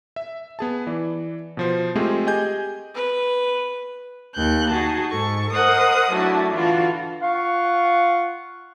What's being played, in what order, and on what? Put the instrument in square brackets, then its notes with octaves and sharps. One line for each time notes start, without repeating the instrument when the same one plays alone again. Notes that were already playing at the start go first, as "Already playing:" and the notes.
[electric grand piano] E5
B3 G#4 A5
E3 D5
B2 F3 C5
G#3 A3 C4 F4 G4 G#4
G4 G#4 D#5 G#5 G6
[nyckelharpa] B4
[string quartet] D#2 F#6 G6
D#4 F#4 G#4 A5
G#2 A4 C#6
A#4 C5 D#5 F#5 D#6
F#3 A3 D4 E4 F#4
D3 E3 F4 F#4
[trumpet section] F4 F#5 C#6 [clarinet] F5